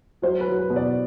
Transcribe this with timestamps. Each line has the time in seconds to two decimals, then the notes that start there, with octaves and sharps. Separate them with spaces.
0.22 F#3 C5
0.41 B4
0.46 F#3
0.58 B4
0.70 B2
0.76 D5